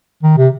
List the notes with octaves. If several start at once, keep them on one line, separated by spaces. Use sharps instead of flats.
D#3
C3